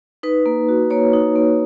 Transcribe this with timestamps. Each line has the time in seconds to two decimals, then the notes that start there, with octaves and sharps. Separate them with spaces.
0.23 D#4 B4
0.46 A#3
0.69 F#4
0.90 A#3 C#5
1.13 D#4
1.36 A#3